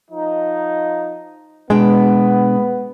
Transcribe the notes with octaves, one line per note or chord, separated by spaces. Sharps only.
F3 D#4
B2 G#3 B3 D4 G5